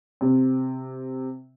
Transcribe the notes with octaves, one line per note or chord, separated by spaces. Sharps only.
C3